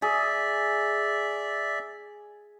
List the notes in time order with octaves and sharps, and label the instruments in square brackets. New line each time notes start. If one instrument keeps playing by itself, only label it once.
[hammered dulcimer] G#4 [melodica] D5 E5